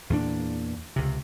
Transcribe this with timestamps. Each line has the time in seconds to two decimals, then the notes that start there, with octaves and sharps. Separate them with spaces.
0.10 E2 A#2 D4
0.96 C#2 C3